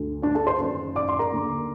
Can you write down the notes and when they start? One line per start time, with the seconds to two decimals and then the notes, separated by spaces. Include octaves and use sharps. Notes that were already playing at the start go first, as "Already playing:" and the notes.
Already playing: D2 D3
0.22 D4 D5
0.35 A4 A5
0.47 C5 C6
0.59 F#1 F#2 D#3
0.96 D5 D6
1.09 C6
1.19 A#4 A#5
1.32 D#2 D3